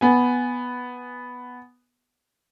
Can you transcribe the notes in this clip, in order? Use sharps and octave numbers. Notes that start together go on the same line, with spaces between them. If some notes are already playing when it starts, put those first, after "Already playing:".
B3 G#5